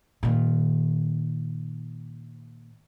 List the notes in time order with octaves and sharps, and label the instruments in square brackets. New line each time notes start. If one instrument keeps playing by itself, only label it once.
[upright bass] A#2 D#3